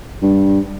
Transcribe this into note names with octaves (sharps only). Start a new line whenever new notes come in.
G2